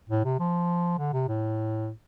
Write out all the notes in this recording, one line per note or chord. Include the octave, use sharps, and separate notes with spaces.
A2
C3
F3
D3
C3
A2